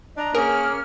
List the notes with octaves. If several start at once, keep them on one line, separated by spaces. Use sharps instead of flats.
D4 D#5 A#5
A#3 C#4 G#4 A#4 F6